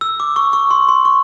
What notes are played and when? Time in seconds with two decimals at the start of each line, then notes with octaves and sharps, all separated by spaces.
0.01 E6
0.20 D6
0.36 C#6
0.53 C#6
0.71 C6
0.89 C6
1.05 C#6